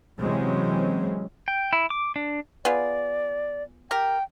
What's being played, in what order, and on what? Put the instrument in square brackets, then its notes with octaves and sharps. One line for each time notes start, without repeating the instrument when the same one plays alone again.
[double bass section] C3 E3 F#3 G#3 C4 C#4
[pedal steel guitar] G5
E4
D6
D4
[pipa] B3 F4 G#4 [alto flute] D5
[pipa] G4 A#4 [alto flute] G5